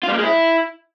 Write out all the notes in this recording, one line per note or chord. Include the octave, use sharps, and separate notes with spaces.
F4
G3
A#3
G#3
E4